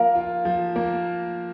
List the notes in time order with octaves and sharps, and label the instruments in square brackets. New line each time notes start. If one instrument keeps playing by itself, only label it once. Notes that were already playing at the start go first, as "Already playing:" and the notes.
Already playing: [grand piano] F3 A#3 A#4 [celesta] F5
[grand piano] F4
F3
A#3